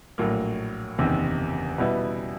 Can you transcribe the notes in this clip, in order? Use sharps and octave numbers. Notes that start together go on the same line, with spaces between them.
A#1 A2 F#3 A#3
F#1 E2 C3 D#3
B2 G3 B3 E4